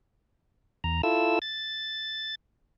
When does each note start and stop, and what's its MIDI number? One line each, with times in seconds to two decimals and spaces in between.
0.84 1.02 40
0.84 1.02 82
1.03 1.39 64
1.03 1.39 65
1.03 1.39 69
1.03 1.39 88
1.42 2.35 93